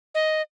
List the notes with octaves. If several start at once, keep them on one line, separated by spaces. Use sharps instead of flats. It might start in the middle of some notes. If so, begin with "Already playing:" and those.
D#5